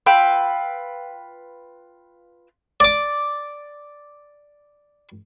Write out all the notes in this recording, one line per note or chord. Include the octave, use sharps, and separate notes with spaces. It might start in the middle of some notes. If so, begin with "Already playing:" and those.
F4 B4 G5 E6
D5 D6